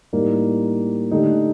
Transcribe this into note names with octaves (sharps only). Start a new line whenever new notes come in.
A2 G3 A#3 D#4
D3 A3 D#4 G4